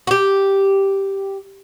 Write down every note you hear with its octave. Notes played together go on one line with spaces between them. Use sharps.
F#4
G4